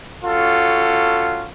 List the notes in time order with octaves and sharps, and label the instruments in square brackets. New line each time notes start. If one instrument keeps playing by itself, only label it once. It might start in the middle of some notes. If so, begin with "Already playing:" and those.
[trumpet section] C#4 F4 F#4 A4